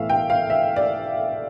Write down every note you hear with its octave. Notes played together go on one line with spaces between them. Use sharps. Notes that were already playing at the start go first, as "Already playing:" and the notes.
Already playing: B1 A2 E3 A3 E5 F5
G5
F5
E5
D5